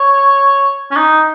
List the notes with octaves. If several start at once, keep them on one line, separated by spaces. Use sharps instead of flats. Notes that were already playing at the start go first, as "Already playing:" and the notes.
Already playing: C#5
C#4
D#4